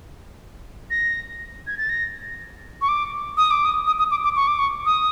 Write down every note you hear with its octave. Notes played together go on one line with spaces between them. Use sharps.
A#6
G#6
A6
A#6
C#6
D6
D#6
D6
D#6
D#6
D#6
D6
D6
C#6
D6
C#6
D#6